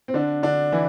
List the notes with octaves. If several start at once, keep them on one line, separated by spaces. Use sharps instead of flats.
C4
D3 D4
D3 D4
E3 E4